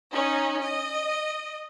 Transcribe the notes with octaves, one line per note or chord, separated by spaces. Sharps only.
C#4 D#4
D#5